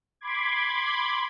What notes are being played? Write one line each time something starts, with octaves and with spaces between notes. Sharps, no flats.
B5 C6 D6 G#6